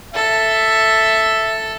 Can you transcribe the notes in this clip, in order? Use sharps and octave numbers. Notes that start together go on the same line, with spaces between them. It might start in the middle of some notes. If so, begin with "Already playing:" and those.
A4 E5